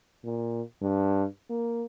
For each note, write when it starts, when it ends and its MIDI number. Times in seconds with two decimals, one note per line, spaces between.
0.24 0.62 46
0.82 1.25 43
1.50 1.84 58